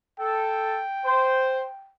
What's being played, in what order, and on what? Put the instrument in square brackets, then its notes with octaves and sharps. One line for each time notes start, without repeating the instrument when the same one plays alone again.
[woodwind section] A4 [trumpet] G5
[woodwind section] C5